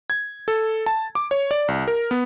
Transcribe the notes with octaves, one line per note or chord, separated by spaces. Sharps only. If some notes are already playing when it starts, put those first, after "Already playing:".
G#6
A4
A5
D6
C#5
D5
C2
A#4
B3